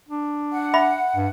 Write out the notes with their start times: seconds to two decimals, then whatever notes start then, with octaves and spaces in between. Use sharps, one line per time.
0.09 D4
0.52 F#5
0.74 E5 B5
1.16 G2